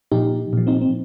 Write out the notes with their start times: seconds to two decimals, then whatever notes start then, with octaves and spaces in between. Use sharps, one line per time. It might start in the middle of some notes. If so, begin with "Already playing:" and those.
0.12 A#2 F3 D#4 G4
0.53 A#2 F3
0.67 C4 D#4
0.81 C4